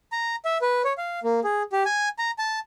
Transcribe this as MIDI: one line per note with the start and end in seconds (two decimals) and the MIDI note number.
0.12 0.36 82
0.45 0.58 76
0.62 0.82 71
0.85 0.93 73
0.98 1.20 77
1.24 1.40 58
1.44 1.63 68
1.73 1.83 67
1.86 2.09 80
2.19 2.31 82
2.39 2.59 81